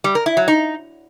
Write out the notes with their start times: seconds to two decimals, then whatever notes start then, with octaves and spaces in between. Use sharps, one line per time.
0.04 G3
0.15 A#4
0.26 E4
0.37 F#3
0.48 D#4